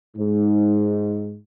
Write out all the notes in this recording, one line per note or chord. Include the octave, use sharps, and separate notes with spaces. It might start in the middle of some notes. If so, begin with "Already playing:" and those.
G#2